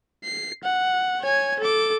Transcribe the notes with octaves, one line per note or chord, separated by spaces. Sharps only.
C7
F#5
C#5 G#5
A4 D6